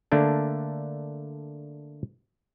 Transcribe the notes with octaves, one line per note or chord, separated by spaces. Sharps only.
D3 A3 A#3 D4